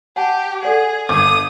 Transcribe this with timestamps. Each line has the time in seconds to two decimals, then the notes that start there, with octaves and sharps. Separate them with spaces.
0.16 G4 F#5 A5
0.63 G#4 A4 D5 F#5
1.09 G1 D6 D#6 G#6